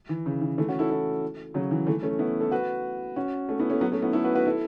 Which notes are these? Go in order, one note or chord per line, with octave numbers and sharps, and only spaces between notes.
E3
C#3
E3
E3 A3
C#4 F#4
E4 A4
E4 A4
C#3 F#3
E3
E3 A3
A3 C#4
B3 E4
E4 A4
F#4 B4
C#4 F#4
A3 C#4
B3 E4
A3 C#4
F#3 B3
A3 C#4
B3 E4
E4 A4
F#4 B4
F#4 B4
E4 A4